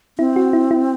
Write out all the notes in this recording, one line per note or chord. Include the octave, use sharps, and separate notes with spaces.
C4 E4
F#4
E4
E4